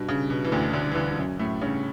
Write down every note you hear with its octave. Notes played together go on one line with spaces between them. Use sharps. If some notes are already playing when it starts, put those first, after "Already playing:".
Already playing: G2 B2
C#3
B2
E3
D2 A2 D3
D2 D3
G2
E3
D2 D3
G2
F#2
F#2 A2 A3
G2 C#3 C#4